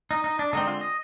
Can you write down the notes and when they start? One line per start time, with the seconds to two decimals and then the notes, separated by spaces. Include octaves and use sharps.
0.11 D#4
0.24 D#4
0.39 D4
0.53 D3 G#3 C4 D#4
0.67 F4
0.81 D#5